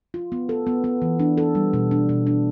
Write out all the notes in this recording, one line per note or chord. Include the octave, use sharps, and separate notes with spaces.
F4
B3
A4
B3
B3
E3
D4
A4
G3
B2
D4
B2
D4